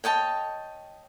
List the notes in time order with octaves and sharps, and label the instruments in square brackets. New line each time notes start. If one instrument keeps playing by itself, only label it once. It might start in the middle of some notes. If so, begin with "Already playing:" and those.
[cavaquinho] C#5 D#5 G5 A5